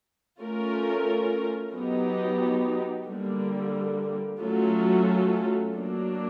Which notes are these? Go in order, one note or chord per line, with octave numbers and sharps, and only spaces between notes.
A3 C#4 F4 A#4
F#3 B3 D#4 G4
D3 G3 A#3
F#3 A3 C#4 F4 A4
F#3 A#3 D4